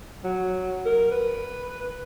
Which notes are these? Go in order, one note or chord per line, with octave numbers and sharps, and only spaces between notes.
F#3
A#4
B4